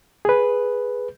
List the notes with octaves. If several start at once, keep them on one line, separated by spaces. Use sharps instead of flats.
G#4 B4